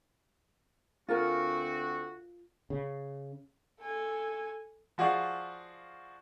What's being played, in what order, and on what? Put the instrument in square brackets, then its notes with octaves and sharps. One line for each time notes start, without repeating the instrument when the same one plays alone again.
[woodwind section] D2 C4 F#4 [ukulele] F4 A#4 G#5
[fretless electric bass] C#3
[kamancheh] A4 G#5
[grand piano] F3 F#4 G#4 D5 F5